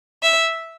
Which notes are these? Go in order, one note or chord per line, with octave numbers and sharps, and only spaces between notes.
E5